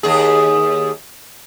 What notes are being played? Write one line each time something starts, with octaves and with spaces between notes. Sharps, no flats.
D#2 G#4